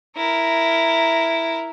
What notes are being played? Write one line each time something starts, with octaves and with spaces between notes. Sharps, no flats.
E4 A#4